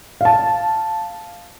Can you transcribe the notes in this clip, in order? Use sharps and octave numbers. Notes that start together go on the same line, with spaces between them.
F5 A5